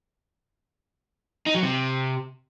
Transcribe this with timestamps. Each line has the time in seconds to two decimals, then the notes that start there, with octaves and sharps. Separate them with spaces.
1.46 D#4
1.55 F#3
1.63 C3